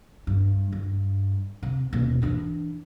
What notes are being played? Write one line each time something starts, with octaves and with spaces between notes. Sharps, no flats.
G2
G2
C3
D#1 B2
E3 D4